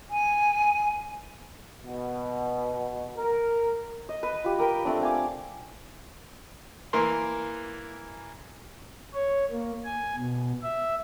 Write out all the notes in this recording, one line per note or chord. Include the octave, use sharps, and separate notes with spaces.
G#5
B2
A#4
D#5
B4
F4 G4
G4 A#4 B4 G5
A3 C4 D4
F5 G#5 D6
E3 A#3 A#4 C6
C#5
A#3
G#5
B2
E5